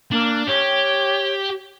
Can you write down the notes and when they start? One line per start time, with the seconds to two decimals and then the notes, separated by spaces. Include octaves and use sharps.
0.11 A#3 D4
0.47 G4 C#5